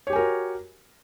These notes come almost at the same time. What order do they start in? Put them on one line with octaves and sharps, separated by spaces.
C#5 G4 G#5 A#4 F#4